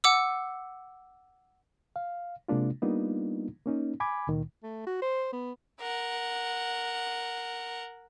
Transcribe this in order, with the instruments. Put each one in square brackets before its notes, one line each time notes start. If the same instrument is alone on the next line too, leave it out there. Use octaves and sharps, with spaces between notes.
[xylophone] F#5 D6 E6
[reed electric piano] F5
C3 G#3 A#3 D4 F4
G3 A#3 B3 D4 D#4 F4
A#3 C#4 D#4
G#5 B5 D6 G#6
C#2 A#2 D#3
[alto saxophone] A3
F#4
C5
B3
[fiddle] A#4 F#5